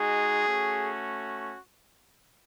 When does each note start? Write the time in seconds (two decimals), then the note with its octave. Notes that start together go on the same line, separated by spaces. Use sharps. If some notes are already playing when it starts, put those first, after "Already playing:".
Already playing: G#3 D#4 F#4 G#4
0.46 A3 C#4 F#4